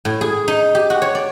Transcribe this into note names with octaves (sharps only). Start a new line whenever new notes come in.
A2
G#4
D#4
G4
F#4
C#5
D5